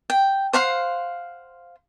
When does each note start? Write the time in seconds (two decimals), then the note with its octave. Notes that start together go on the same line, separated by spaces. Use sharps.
0.10 G5
0.53 C5 F5 F#5 C6